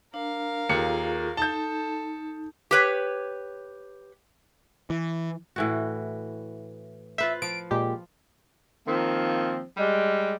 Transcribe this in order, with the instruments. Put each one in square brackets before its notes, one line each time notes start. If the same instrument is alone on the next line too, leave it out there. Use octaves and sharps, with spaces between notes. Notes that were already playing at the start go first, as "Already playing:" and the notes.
[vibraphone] D4 [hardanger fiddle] A#4 F5
[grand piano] D#2 C#7 [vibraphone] F4 G#4 A4
[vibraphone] D#4 [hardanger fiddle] A4 [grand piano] A5 G6
[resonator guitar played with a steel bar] G4 B4 C#5
[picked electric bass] E3
[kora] A2 E3 F#4
[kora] F4 B4 C5 [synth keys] E5
[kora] F3 [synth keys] D7
[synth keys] A#2 G#3 G4
[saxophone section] D#3 F3 A#3 C4
G3 G#3